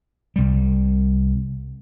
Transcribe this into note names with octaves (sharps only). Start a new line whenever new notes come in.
C2 G3